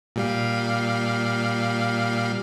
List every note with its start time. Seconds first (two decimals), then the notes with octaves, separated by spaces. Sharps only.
0.16 A#2 G3 F5